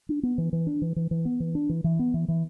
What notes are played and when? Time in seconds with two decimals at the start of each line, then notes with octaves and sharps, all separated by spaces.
0.09 D4
0.23 B3
0.38 E3
0.53 E3
0.67 D4
0.82 E3
0.96 E3
1.11 E3
1.25 B3
1.40 E3
1.55 D4
1.69 E3
1.84 E3
1.99 B3
2.14 E3
2.28 E3